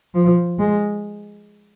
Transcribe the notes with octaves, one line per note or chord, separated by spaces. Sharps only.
F3
G#3